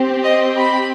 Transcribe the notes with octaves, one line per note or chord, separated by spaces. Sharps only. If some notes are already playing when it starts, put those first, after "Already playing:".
Already playing: C4 G4
D#5
B5